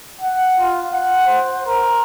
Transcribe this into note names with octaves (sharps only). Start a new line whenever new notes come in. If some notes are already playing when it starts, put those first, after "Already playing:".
F#5
F4
F#5
C5
A#4